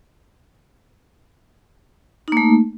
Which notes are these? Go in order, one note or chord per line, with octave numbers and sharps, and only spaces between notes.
A3 A#3 D#4